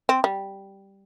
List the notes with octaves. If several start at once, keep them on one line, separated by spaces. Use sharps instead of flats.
C4
G3